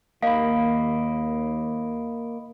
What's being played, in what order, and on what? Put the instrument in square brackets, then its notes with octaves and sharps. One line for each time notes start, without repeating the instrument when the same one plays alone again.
[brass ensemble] D#2 [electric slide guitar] A#3 [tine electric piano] D#5 B5 [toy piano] F5